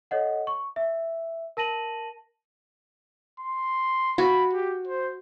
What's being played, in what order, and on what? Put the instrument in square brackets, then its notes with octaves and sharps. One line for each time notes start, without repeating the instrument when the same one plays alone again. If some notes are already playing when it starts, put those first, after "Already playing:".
[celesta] A4 C#5 D#5 F#5
C#6
E5
A#4 A5 A#6 D#7 F#7
[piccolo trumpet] C6
[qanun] F#4 [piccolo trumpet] B5
[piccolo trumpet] G4
C5